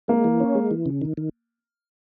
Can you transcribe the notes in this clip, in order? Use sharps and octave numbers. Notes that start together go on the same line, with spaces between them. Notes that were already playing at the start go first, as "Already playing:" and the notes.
G#3 A#3
E3
C#4
G#3
E3
C#3
D#3
D#3